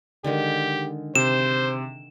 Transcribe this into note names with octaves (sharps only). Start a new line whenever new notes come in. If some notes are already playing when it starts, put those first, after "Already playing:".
D3 D#3 G#3 G4
C3 C5 E7